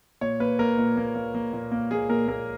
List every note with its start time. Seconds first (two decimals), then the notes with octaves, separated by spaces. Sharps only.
0.21 A#2 C#5
0.40 A#3 B4
0.59 A#3 A#4
0.78 A#2
0.97 A#3
1.15 A#3
1.35 A#3
1.53 A#2
1.72 A#3
1.91 A#3 G#4
2.09 A#2 A#4
2.28 A#3 A#4